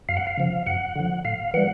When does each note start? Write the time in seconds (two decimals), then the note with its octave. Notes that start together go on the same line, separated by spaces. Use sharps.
0.09 F#2 F5
0.17 F#5
0.27 F5
0.37 C#3 F3
0.66 F#2 F#5
0.96 D3 F3
1.25 A2 F5
1.54 E3 G3 F#5